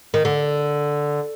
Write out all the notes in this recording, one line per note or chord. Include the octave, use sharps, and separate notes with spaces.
D#3
D3